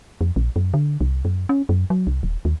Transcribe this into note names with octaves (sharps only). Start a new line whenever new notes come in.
F2
A#1
F#2
D3
C2
F#2
C#4
F#2
F#3
C2
D#1
D#2